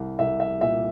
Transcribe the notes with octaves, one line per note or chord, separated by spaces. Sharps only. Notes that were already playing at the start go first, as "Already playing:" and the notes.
Already playing: C2 G3
C2 E5
E5
A#2 E5